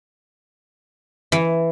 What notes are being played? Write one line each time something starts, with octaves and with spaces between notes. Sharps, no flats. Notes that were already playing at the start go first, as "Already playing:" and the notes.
E3